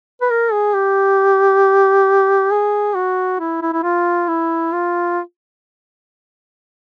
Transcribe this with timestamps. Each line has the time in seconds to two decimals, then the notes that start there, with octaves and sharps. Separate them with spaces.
0.21 B4
0.30 A#4
0.52 G#4
0.74 G4
2.51 G#4
2.95 F#4
3.40 E4
3.62 E4
3.73 E4
3.83 F4
4.28 E4
4.73 F4